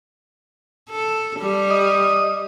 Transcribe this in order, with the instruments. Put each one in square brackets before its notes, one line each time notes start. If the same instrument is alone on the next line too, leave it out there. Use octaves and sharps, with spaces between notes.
[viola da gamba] A4
G3
[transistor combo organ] D#5 D#6